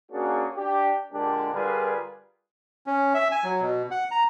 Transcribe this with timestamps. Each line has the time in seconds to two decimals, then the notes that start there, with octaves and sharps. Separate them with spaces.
0.11 A#3 C#4 D4 F#4 G#4
0.56 D4 G4
1.13 A#2 D3 G#3 A#3 D4 G4
1.53 D3 G3 F4 G#4 A#4 B4
2.87 C#4
3.14 E5
3.32 G#5
3.44 F#3
3.62 B2
3.91 F#5
4.11 A#5